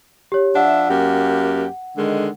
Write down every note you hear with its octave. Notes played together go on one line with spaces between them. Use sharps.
G4 C#5
F3 D4 E5 F#5
F#2 A#3 G4
D3 D#3 G#3